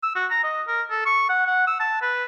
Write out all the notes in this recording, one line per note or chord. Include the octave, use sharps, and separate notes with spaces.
E6
F#4
A#5
D#5
A#4
A4
C#6
F#5
F#5
E6
A5
B4